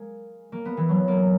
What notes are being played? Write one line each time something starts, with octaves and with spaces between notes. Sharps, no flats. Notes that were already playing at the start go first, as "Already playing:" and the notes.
Already playing: G#3 A#3
A#3
B3
E3
F#3
A#3